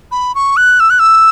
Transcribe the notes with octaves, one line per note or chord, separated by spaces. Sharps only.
B5
C#6
F#6
E6
F#6
E6